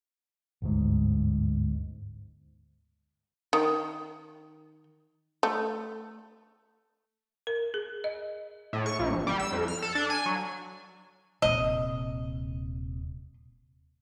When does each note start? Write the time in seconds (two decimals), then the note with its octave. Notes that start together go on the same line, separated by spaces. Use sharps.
0.62 G1 D2 G#2
3.53 D#3
5.43 A3
7.47 A#4
7.74 G#4
8.04 D#5
8.73 A2
8.86 C#6
8.99 A#1
9.12 G1
9.27 G3
9.40 E6
9.52 F2
9.68 F6
9.82 A4
9.95 D4
10.10 G#5
10.26 F#3
11.42 D#1 C3 D#5